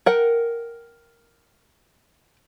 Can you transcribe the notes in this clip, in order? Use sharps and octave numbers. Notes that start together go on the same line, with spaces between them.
A#4 F#5 G5